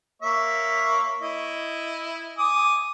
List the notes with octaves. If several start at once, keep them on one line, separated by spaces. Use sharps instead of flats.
A#3 C#5 E5
E4 D#5
G#5 D6 D#6